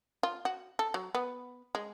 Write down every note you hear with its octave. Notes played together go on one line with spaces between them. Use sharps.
F4
F#4
A4
F#3
B3
G#3